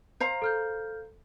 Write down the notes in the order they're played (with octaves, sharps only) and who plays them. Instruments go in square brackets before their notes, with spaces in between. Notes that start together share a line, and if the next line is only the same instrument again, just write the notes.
[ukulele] C5 F5 A#5
[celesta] A4 F6 G6